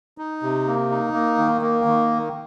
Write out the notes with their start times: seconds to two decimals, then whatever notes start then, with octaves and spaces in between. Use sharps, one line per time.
0.18 D#4
0.43 C3
0.67 A#3
0.90 D#4
1.13 A#3
1.38 D#3
1.61 A#3
1.85 D#3